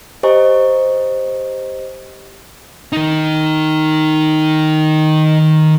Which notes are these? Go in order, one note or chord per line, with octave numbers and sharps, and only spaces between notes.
G4 C5 D#5 G#5 A#5 C#6
D#3 D#4